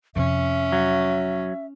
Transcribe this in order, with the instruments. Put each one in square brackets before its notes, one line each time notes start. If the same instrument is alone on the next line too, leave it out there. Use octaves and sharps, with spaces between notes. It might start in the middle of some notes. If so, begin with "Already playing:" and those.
[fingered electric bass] F2 C3 [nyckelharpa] C#4 [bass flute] E5
[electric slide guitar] F#3